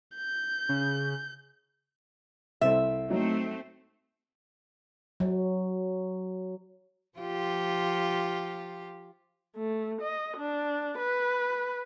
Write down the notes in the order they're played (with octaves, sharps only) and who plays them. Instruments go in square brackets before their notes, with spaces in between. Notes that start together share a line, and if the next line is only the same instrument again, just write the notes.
[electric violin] G6
[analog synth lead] C#3
[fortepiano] C2 C4 A4 [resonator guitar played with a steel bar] E5
[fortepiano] F#3 D#4 C#5 [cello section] A3 C4
[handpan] F#3
[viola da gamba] F3 F4 G4
[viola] A3
D#5
D4
B4